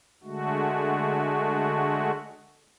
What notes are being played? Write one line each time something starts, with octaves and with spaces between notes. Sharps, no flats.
D3 G#3 A3 F#4